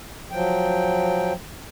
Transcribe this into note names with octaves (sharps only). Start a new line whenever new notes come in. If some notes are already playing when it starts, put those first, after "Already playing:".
F3 F#3 G5